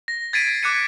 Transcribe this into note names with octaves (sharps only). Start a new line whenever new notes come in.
A#6
G#6 A6 B6 C7 D7 D#7
D6 F#6 G#6 C#7 D#7